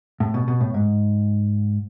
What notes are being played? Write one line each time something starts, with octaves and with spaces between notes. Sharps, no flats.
A2
B2
B2
A2
G#2